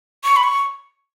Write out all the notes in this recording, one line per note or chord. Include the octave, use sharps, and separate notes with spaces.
C#6
B5
C#6